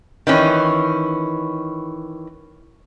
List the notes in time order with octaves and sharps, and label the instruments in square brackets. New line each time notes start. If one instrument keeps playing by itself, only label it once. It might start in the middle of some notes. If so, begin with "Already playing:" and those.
[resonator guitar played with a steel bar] D#3 E3 C#4